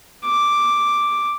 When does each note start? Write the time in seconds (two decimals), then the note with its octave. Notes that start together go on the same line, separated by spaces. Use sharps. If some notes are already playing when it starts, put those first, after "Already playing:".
0.25 D6